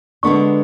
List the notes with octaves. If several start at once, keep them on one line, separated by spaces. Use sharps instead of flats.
D3 G#3 B3 D4 C#6